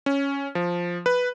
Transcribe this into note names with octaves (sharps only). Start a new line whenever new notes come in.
C#4
F3
B4